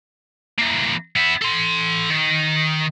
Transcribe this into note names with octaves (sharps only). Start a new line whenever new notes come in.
E3 A#3
B3 E4
A4 C6
D#3